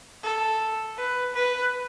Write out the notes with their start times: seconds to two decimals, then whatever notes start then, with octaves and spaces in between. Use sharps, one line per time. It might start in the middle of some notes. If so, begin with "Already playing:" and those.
0.23 A4
0.97 B4
1.34 B4